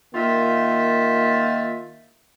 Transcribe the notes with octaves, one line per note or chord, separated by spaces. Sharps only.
D#3 A#3 F4 E5